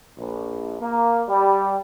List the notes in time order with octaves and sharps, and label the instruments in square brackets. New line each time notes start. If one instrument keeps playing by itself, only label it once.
[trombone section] A#1
A#3
G3